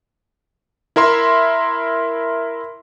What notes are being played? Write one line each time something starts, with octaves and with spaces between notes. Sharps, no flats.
E4 A#4 E5 C6